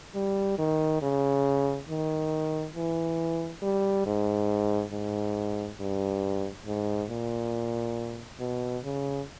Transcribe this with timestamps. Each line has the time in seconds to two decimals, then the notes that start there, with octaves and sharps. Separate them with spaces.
0.15 G3
0.59 D#3
1.02 C#3
1.89 D#3
2.76 E3
3.63 G3
4.07 G#2
4.92 G#2
5.80 G2
6.66 G#2
7.10 A#2
8.40 B2
8.84 C#3